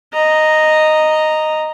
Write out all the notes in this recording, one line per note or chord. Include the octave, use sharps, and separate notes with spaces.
D#5 A#5